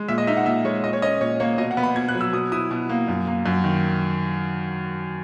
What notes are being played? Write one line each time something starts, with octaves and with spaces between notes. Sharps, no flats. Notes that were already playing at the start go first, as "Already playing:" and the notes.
Already playing: G#3
A#2 E5
D#5
D#4 E5
F#5
A#2 E5
G#3 C#5
A#2 D#5
C#5
C#4 D#5
A#2 C#5
A#3 C#5
B2 D#5
F#5
B3
B5
B2 G#6
F#6
F#3
E6
B2 D#6
E4 D#6
B2
A#3
F#2
A#3
F#2
D#3